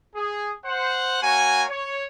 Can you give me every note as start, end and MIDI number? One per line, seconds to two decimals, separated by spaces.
0.16 0.52 68
0.66 1.23 72
0.66 1.23 78
1.23 1.65 58
1.23 1.65 66
1.23 1.65 73
1.23 1.65 80
1.70 2.06 73